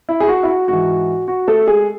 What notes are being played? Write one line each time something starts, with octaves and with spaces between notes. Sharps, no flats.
E4
G#4
F#4
E4
F#4
G#2 E3 F#4
F#4
A3 A4
G#3 G#4